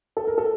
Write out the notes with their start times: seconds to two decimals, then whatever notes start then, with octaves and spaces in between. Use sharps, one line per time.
0.17 A4
0.27 A#4
0.38 A4